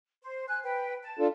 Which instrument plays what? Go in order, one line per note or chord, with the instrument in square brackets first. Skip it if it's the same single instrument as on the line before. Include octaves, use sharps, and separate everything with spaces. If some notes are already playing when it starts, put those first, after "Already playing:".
[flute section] C5
G#5 F#6
B4 G5
A5
[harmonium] D4 F4 A4